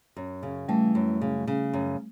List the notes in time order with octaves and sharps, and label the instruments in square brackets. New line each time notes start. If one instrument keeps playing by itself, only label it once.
[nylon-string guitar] F#2
C#3
[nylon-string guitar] E3 [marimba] G3 A3
[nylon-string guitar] F#2
C#3
C#3
F#2